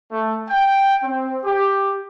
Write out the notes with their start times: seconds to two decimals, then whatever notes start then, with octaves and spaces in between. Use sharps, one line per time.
0.12 A3
0.50 G5
1.03 C4
1.44 G4